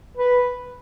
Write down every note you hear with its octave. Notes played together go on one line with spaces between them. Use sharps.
B4